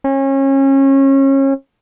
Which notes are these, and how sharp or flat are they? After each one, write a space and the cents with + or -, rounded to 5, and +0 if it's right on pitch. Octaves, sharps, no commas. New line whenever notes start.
C#4 -30